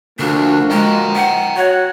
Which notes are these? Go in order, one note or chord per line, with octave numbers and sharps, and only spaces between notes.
D2 F3 A#3 D4 F#4
G#3 G5 A#5
F#5
F#4 C#5 F#5